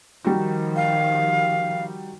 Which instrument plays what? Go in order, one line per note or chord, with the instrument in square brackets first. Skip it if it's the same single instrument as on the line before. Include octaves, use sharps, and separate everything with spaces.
[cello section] D#3 F3 [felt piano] G3 D#4 F#4
[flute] F5